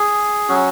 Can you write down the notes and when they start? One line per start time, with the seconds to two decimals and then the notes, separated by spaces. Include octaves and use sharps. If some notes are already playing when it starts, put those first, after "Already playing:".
Already playing: G#4
0.49 F#3 C#4 F#4